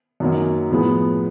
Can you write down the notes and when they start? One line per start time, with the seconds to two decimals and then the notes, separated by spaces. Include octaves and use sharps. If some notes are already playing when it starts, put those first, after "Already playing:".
0.20 F#2 D#3 F#3 A#3
0.71 A2 F3 G#3 B3